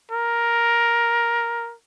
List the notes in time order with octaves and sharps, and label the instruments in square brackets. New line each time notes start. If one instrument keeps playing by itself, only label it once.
[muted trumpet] A#4